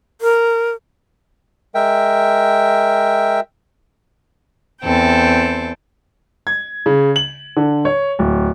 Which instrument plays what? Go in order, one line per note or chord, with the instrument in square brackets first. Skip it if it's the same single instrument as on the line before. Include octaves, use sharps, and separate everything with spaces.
[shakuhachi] A#4
[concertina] G#3 A#4 E5 G5
[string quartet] E2 C4 A4 G5
[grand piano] G#6
C#3
F#7
D3
C#5
D1